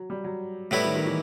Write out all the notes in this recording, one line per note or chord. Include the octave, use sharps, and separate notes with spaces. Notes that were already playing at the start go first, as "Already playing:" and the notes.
Already playing: F#3
G3
F#3
A2 F#3 G3 B3 E4
D#3
D#3
E3